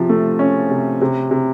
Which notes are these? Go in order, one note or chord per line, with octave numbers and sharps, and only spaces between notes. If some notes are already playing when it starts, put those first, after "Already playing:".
Already playing: C3 F3
A3
C#4
C3
C3
C3